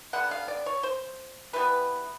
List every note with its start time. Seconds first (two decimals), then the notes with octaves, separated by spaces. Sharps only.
0.13 D3 G3 B3 F#5
0.31 F5
0.48 D5
0.66 C#5
0.83 C5
1.53 E3 G3 B3 B4